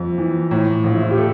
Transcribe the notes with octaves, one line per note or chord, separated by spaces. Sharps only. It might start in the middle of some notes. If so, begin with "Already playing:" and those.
Already playing: F2
E3
A2
A#1
E4
F4
G4
A3 A4